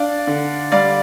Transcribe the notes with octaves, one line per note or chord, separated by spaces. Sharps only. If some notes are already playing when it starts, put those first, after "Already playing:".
Already playing: D4 D5 F5
D3
G3 D5 F5